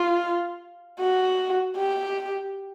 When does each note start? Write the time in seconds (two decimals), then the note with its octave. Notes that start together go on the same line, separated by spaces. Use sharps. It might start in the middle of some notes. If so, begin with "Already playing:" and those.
Already playing: F4
1.00 F#4
1.77 G4